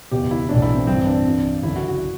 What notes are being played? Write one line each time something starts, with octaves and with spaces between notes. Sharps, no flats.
F#1 E2 B2 G4
E4
B1 A2 E3 D4
E4
C4
G1 G2 E3 C4
D4
C2 C3 E3
F#1 F#2 D3 E4
F#4
F#4